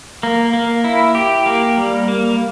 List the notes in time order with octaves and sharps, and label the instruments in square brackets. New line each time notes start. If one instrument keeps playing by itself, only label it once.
[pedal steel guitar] A#3
A#3
E4
G4
A#3
G3
A#3